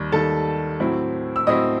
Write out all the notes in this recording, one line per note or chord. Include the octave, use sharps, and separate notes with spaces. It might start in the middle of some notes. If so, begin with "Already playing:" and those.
Already playing: D#2 D#3 G3
D#2 D#3 G3 A4 A5
A2 F#3 C4 E4
E6
A2 F#3 C4 E4 D#5 D#6